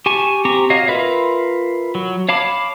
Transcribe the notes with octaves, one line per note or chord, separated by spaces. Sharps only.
G4 G#5 A5 C#6
C4 G4 A#5 C#6
F#4 C#5 D#5 F5
F4 A#4 B4 E5 F5
F#3
C#5 F5 A5 B5 D6